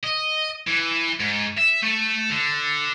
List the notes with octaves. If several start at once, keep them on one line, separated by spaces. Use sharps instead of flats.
D#5
E3
G#2
E5
A3
D3